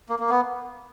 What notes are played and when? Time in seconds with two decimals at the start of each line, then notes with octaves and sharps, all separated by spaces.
0.09 A#3
0.19 A#3
0.30 B3